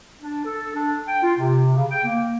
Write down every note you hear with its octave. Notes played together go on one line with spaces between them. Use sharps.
D4
A4
D4
G5
F4
C3
C#3
G5
A#3